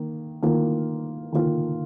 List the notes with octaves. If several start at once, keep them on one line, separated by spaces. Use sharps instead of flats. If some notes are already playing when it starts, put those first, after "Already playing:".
Already playing: D#3 A#3
D#3 A#3 F4
D#3 A#3 F4